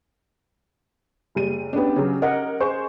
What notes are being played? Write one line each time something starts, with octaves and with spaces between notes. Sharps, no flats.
F#1 G3 D#7
B3 C#4 D4 G4
C#3 F#3 C#4
A#4 D#5 F#5
G#4 C5 C#6